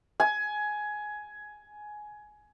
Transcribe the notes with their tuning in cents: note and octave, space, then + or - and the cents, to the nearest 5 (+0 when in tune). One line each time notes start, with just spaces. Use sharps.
G#5 +15